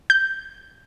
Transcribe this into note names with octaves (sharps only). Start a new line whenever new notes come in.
G6